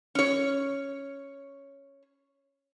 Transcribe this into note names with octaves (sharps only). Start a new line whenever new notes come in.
C#4 C#5